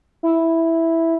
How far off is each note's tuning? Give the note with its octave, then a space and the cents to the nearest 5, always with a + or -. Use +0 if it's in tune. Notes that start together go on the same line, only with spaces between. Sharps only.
E4 -5